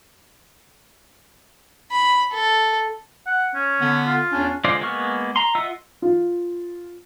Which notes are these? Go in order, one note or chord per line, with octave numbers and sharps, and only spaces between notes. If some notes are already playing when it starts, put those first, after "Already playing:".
B5
A4
F#5
C#4
D3 B3
F4
E2 C#4 D4
D3 G#3 F4 C5 D5
G#3 A#3 B3 C#6 F6
A#5 C6
F4 D#5 E5 F#5 E6
F4